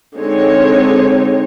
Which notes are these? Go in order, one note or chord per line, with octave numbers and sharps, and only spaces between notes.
D3 G#3 C4 D#4 C#5